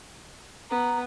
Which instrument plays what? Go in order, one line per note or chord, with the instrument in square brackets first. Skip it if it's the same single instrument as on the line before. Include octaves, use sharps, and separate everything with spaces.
[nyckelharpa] B3 [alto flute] A#5